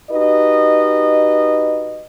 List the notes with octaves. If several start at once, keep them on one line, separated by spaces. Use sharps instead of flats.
D#4 F#4 G4 B4 D#5